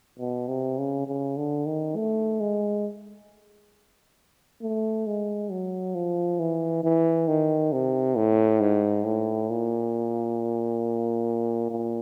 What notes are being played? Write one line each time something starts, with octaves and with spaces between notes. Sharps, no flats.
B2
C3
C#3
C#3
D3
D#3
A3
G#3
A3
G#3
F#3
F3
E3
E3
D#3
C3
A2
G#2
A2
A#2
A#2